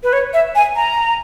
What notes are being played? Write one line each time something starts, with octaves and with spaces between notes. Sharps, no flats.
B4
C#5
E5
G#5
A#5